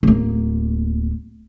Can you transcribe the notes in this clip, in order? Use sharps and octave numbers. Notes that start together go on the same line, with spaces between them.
D1 A#3